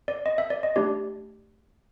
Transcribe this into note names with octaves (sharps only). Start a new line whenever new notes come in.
D5
D#5
E5
D5
D#5
A3 D4 G4 D5